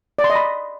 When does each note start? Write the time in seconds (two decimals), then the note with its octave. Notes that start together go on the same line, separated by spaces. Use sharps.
0.19 D5
0.24 C6
0.30 D#5
0.35 B5